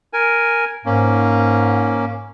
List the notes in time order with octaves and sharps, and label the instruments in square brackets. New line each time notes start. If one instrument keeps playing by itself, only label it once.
[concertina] A#4 G#5
[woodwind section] G#2 [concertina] A#3 C#4